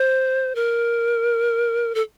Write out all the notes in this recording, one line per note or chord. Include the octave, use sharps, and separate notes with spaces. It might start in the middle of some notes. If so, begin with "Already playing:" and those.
Already playing: C5
A#4
A4